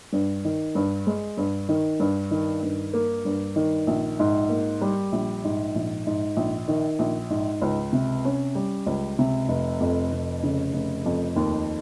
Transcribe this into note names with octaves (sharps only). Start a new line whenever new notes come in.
G2
D#3
G2
G#3
G2
D#3
G2
D#3
G2
A#3
G2
D#3
A#1
G#2
A#3
G3
A#1
G#2
A#1
G#2
A#1
D#3
A#1
G#2
C#2
C3
C#4
G3
C#2
C3
F1
F2
F1
C#3
F1
F2
D#2